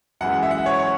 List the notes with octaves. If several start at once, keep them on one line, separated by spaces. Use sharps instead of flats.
F#2 E3 G#3 F#5
E5
F#5
E5
C#5
C#5